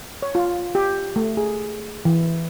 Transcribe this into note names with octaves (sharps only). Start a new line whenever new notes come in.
C#5
F4
G4
A3
G#4
E3